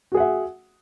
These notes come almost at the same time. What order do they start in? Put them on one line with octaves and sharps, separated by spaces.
F#4 G#4 F#5 E5